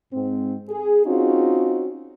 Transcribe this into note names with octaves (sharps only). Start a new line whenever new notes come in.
G#2 C4
G#4
C4 C#4 D#4 F4 F#4